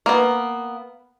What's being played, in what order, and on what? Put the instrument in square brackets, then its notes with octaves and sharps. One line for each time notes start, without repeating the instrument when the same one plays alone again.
[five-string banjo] A#3 B3